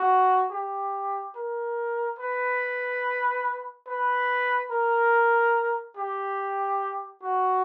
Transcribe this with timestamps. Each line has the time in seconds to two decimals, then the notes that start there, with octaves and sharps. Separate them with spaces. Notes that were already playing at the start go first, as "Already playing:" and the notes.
Already playing: F#4
0.51 G4
1.35 A#4
2.19 B4
3.87 B4
4.71 A#4
5.97 G4
7.23 F#4